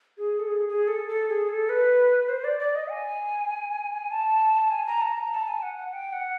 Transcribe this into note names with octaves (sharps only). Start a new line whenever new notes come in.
G#4
A4
G#4
G#4
A4
A4
G#4
A4
B4
C5
D5
D5
D#5
G#5
A5
G#5
A#5
A5
A#5
A5
G#5
F#5
F#5
G5
F#5